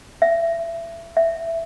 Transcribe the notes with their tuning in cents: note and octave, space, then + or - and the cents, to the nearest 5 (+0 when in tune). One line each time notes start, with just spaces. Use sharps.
E5 +25
E5 +10